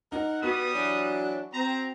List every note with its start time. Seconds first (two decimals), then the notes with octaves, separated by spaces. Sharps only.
0.12 D#4 A#4 F#5
0.42 G3 B3 F#4 D#6
0.73 E3 F#3 D4
1.53 C4 A#5